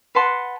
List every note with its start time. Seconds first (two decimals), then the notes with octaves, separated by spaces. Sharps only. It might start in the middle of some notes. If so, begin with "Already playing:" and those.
0.15 B4 F#5 A5 C6